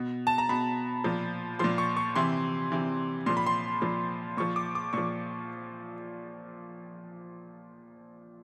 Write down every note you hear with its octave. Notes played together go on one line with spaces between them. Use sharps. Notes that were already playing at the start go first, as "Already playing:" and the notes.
Already playing: B2
A5
A#5
B2 B5
A#2 F3
A#2 F3 C6
C#6
C#6
C3 E3 C6
C3 E3
A#2 F3 C6
B5
C6
A#2 F3
A#2 F3 C#6
D6
D6
A#2 F3 C#6